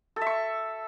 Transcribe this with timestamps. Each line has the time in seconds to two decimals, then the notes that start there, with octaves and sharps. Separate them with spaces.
0.16 A4
0.21 E5
0.27 C#6